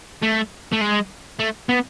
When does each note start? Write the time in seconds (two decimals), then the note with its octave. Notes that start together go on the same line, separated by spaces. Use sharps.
0.23 A3
0.72 A3
0.81 G#3
1.39 A3
1.69 B3